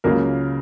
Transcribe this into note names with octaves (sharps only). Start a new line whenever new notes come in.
C#2 C#3 F#3 A#3 A#4